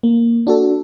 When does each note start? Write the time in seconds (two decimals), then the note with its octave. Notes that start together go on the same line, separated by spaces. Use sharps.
0.03 A#3
0.47 D4 F#4 A4